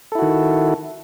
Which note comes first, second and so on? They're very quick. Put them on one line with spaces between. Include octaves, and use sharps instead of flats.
A4 E4 F#4 D#3